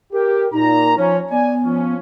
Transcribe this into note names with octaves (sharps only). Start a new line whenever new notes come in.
G4 A#4
A#2 D#4 A#5
F3 C#4 C#5
B3 D5 G#5
F3 C#4